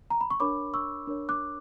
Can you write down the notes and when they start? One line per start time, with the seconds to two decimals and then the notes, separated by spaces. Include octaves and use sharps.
0.10 A#5
0.21 B5
0.30 C#6
0.40 D4 A#4 C#5 B5 D6
0.74 C#6 E6
1.07 D4 A#4 C#5
1.29 D6 F#6